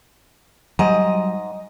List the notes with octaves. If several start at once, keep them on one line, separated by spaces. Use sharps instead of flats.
G#2 F#3 G3 D#5